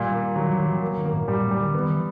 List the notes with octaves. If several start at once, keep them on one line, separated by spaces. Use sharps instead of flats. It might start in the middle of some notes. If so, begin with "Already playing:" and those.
Already playing: A#2 D#3 G3
A#3
D#3 F#3
D#3
F#3
E3
A#3
D#3
A#3
A2
A#2 G3
A2
G3
D3
D#3 B3
E3